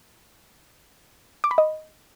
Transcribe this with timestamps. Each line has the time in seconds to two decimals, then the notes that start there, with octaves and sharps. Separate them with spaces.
1.44 D6
1.51 B5
1.58 D#5